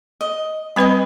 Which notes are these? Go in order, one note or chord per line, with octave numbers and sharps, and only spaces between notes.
D#5
G3 C4 B4 D#5 B5